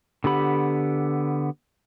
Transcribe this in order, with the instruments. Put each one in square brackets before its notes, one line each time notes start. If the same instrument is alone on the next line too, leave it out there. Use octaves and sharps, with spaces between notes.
[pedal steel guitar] D3 B3 G4 B5